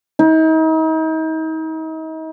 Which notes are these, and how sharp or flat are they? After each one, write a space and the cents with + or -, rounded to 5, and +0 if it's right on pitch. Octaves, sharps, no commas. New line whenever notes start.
D#4 +40